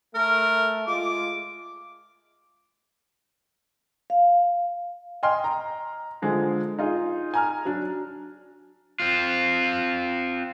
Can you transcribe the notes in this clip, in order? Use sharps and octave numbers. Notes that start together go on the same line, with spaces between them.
A3 A#4
G#3 F4 D6
F5
D#5 G5 G#5 C6 F6
A#5
D3 F3 G#3
D#4 F4 G#4
G#5 A#5 F6
F#3 D4
C4 F4